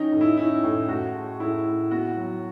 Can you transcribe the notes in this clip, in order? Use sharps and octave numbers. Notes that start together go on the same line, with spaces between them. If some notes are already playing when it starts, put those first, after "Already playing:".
Already playing: D#3 C#4 D#4
A2
E4
C#4 E4
A2
A2 F#4
G#3
A2 E4
A2
B3 F#4
F#3